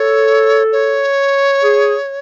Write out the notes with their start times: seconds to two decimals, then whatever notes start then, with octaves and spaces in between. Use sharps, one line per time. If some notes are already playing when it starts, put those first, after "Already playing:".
Already playing: A4 C#5
0.72 C#5
1.64 G#4